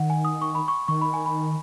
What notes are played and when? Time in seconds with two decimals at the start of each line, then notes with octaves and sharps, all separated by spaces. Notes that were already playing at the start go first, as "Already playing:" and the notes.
Already playing: D#3 F#5
0.10 G#5
0.25 D#6
0.42 C#6
0.55 B5
0.68 C#6
0.88 D#3 C#6
1.02 B5
1.14 G#5
1.26 B5